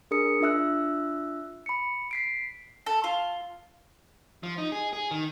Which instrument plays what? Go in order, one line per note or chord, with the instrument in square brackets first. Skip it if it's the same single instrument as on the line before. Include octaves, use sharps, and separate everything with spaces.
[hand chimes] D4 G#4 A#4 D#6 C#7
D4 F4 E5 E6 F#6
B5 C#7
B6 C7 D7
[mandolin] A4
F4
[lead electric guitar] F3
D#4
G#4
G#4
D#3